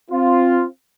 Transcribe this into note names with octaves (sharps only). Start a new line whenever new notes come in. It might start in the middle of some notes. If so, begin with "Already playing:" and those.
C4 F4